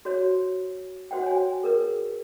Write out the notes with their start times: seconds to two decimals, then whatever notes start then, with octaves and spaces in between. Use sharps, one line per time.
0.05 F#4 C5 C#5
1.11 F#4 C5 F#5 G5
1.23 C#5 G#5
1.63 G#4 A#4 B4